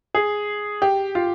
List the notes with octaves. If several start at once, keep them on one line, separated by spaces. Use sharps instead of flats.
G#4
G4
F4